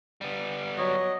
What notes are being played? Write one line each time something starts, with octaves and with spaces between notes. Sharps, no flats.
G3 B3
F#3 C#5 D#5